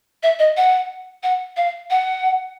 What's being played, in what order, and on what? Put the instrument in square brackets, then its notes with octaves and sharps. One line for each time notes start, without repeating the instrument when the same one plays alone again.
[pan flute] E5
D#5
F#5
F#5
F5
F#5